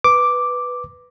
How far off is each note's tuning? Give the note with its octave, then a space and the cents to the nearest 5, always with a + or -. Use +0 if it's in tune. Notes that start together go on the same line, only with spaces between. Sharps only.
B4 +0 D6 +0